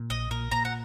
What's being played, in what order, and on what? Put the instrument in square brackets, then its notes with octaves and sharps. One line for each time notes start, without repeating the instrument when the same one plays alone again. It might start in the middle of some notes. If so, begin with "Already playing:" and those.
Already playing: [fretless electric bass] A#2
[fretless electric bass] A#1 [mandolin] D#5
[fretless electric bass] A#2 [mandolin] A#4
[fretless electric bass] A#2 [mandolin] A#5
[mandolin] F#5